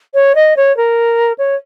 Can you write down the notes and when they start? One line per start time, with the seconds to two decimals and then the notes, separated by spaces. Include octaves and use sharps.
0.14 C#5
0.35 D#5
0.56 C#5
0.77 A#4
1.38 C#5